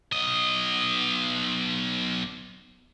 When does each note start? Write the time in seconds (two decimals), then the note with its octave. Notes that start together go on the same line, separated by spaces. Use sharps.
0.12 B1 D#5